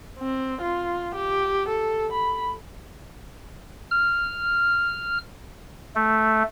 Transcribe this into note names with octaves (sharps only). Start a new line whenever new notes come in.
C4
F4
G4
A4
B5
F6
A3